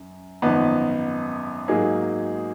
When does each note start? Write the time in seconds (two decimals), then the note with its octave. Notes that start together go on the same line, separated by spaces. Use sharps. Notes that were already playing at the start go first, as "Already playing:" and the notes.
Already playing: F#2
0.42 G#1 F#2 F3 B3 D#4
1.68 G#2 F#3 A#3 D#4 G#4